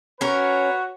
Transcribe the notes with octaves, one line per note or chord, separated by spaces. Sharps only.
C#4 F#4 A#4 B4 C#5